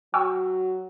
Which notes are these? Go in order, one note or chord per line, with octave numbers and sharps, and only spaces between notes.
F#3 G5 C#6 E6